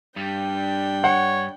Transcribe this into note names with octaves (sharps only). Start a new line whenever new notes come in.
G2 G3 D4 G5
C#5 F#5